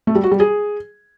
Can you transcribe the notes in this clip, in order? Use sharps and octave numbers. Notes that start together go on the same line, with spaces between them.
A3
G3
F#4
G3
G#4